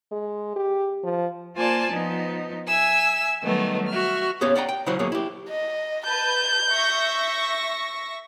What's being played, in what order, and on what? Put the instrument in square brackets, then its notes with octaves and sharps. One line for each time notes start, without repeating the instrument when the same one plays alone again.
[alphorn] G#3
G4
F3
[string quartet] A#3 F4 C5 D5 G#5 A5
F3 B3 D#4
E5 G#5 E6
D#3 F#3 G3 A3 B3 D#4
F#4 E5 F6
[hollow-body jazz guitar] B3 C#4 G4 G#4 C#5 F5
D5 F#5 G5 A#5
G5
C#3 E3 F#3 E4 C5 F#5
F#2 B2 F#3 A#3 G#4 C#5
E4 G4
[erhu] D#5
[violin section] B4 A5 [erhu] G6
[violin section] E5 C#6 A#6